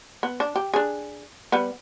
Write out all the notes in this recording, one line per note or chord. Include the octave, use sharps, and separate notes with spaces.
B3
D4
G4
D4 G#4
G3 B3